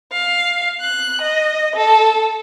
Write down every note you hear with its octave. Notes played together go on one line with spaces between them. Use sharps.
F5
F#6
D#5
A4